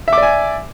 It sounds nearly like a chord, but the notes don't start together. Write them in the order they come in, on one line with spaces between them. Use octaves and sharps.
E5 D6 D5 G#5